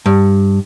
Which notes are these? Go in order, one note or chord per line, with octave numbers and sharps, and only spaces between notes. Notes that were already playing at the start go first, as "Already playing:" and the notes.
G2